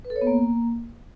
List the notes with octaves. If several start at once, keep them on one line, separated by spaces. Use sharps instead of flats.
B4
A4
C#5
B3
A#3